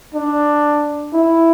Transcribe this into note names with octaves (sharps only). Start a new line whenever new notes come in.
D4
E4